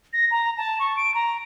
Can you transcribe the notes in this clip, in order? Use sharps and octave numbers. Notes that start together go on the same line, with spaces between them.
A#6
A#5
A5
C#6
D7
A#5